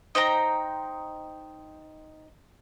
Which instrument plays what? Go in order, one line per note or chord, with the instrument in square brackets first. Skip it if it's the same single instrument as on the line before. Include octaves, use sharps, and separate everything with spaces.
[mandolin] D#4 C5 G5 A#5